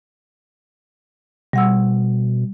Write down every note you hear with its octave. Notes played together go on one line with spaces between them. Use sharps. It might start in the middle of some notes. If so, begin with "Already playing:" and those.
B2 G3 F#5 E6